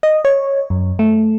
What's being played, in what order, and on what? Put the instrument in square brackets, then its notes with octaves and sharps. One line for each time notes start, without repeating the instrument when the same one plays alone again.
[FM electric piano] D#5
C#5
F#2
A3